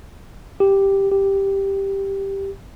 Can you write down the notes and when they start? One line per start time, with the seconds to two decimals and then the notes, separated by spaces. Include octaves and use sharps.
0.60 G4
1.12 G4